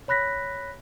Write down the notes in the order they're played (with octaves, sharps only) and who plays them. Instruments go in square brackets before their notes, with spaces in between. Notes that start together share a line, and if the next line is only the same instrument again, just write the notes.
[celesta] C#5 B5 F#6 A#6 B6